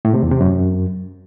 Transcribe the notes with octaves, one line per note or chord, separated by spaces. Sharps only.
A2
C3
E2
C3
F#2